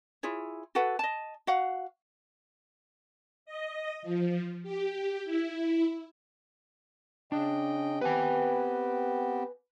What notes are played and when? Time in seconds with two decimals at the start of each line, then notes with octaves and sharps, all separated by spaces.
0.23 E4 F4 G#4 C#5
0.75 F#4 A4 B4 F#5
0.99 D#5 A5
1.47 F#4 F5 F#5
3.46 D#5
4.02 F3
4.63 G4
5.25 E4
7.32 C#3 D4 D#5 G5
8.01 B3 C4 G4 B4 G#5